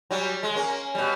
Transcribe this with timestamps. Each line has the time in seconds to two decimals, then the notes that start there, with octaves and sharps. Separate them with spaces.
0.11 F#3 G3
0.43 G#3
0.55 A#3 C#4
0.95 B2 G3